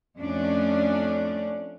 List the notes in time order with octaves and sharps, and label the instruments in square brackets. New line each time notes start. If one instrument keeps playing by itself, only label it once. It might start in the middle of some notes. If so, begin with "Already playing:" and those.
[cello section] F2 A3 C#4 D4